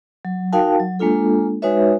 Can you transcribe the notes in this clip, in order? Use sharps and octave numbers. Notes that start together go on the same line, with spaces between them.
F#3
D#4 F#4 A#4 F5 G5 A5
F#3
G#3 A#3 D4 F4 A4
G#3 D#4 F#4 B4 C#5 E5